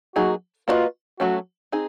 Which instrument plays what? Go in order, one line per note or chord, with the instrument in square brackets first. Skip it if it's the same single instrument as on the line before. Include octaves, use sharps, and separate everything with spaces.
[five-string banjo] F#3 A#3 D#4 G#4 [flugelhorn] F#4
[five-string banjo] A#3 D4 F#4 B4 D#5 [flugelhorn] F4
[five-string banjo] F#3 A3 C#4 [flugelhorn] F#4
[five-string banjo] C4 D#4 G#4